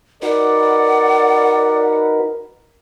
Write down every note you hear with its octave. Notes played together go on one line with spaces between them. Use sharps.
D#4 F#4 A#4 B4 D5 F#5